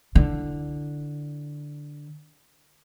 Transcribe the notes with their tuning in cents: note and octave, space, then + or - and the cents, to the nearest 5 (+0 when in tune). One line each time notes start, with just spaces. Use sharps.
D3 +0 E4 +0